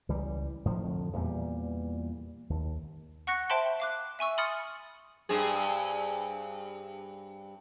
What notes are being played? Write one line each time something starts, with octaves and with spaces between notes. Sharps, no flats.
C#2 E3 G3
F2 A2 D#3 F3
F2 D3
E2 A#2 G3
D#2
F#5 C#6 F#6 A#6 C#7
C5 E5 G5 A5 B5 C6
F5 D6 F#6
E5 G#5 C#6 E6
B5 C6 D#6 F6 A6 C#7
G2 C4 G#4